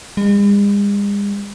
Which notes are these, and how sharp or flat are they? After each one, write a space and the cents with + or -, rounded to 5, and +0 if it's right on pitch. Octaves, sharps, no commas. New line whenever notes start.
G#3 -45